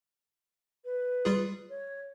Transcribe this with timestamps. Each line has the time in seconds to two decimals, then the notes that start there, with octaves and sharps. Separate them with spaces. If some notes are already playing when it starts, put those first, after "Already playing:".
0.85 B4
1.25 G3 F4 G#4
1.70 C#5